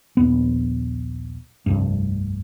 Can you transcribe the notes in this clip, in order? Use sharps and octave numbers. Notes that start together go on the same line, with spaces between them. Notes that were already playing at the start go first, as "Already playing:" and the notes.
A#1 D#2 B3
F1 C2 G2